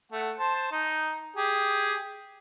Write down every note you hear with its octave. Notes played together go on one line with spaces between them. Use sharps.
A3 F#5
C5 A5
D#4
G4 G#4